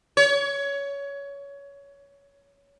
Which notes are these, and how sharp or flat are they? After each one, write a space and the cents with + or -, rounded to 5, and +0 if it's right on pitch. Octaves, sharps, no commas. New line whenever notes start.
C#5 +20